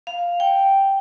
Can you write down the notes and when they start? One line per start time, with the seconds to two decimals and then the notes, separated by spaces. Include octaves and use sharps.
0.07 F5
0.40 G5